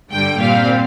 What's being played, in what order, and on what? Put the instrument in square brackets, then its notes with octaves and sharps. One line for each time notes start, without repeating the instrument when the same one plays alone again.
[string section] G2 D3 G3 G5
A#2 G3 C4 F5